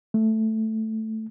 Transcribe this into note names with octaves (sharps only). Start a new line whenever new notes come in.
A3